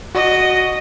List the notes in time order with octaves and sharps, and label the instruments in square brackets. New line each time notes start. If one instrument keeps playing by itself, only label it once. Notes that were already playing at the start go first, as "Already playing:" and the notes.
[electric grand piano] F#4 [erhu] D#5